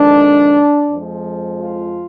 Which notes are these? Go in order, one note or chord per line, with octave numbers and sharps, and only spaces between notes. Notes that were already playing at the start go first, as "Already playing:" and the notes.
Already playing: F2 D#3 G#3 D4
F2 F3 G#3
F4